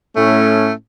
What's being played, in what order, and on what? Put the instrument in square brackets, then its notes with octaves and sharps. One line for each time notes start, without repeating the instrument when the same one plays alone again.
[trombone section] A2 C#4 [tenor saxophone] A3